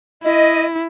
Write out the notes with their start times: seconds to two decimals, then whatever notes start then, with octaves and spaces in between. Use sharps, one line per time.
0.23 E4 D#5